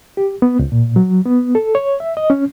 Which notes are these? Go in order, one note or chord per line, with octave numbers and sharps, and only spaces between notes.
G4
B3
C#2
A#2
F#3
B3
A4
C#5
E5
D#5
C#4